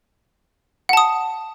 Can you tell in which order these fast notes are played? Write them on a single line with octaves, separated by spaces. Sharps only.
F#5 A5 D#6